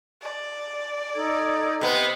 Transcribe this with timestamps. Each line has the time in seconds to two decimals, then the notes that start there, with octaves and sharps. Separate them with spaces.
0.22 D5
1.14 D#4 A4 G#6
1.81 C3 B3 D#5